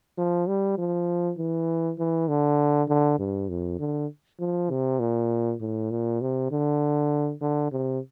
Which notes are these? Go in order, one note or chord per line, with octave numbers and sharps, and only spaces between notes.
F3
G3
F3
E3
E3
D3
D3
G2
F2
D3
F3
C3
A#2
A2
A#2
C3
D3
D3
C3